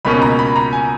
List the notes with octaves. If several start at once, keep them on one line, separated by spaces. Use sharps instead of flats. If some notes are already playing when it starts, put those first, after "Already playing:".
C#2 B2 A#3 C#4 B5
A#5
B5
A#5
G#5